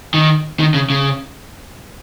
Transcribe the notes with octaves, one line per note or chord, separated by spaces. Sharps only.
D#3
D#3
C#3
C#3